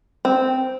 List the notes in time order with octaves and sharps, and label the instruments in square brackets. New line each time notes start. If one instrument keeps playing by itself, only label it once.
[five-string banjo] C4